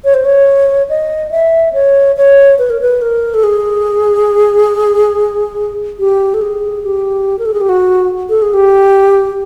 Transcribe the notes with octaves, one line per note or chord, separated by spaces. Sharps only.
C#5
C5
C#5
D#5
E5
C#5
C#5
B4
A#4
B4
A#4
A4
G#4
G4
A4
G#4
G4
A#4
A4
G#4
G4
F#4
A4
G#4
G4